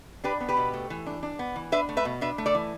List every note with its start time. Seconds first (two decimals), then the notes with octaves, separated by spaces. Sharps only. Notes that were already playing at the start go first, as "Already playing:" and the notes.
0.24 D4 G4 B4
0.40 B3
0.49 G4 B4
0.57 B2
0.74 A3
0.90 E3
1.06 D4
1.23 D4
1.39 B3
1.56 E3
1.72 D4 B4 E5
1.89 A3
1.97 B4 E5
2.05 B2
2.21 D4 B4 E5
2.38 A3
2.46 A4 D5
2.55 E3